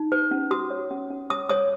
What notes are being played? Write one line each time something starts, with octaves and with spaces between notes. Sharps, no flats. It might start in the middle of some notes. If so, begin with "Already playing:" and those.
Already playing: D#4
B4
C#4
F#4 D#6
C#5
C#4
C#4
C#5 D#6
C#5 D#6